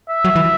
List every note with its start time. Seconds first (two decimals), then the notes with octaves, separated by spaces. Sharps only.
0.09 E5
0.25 F#3
0.36 E3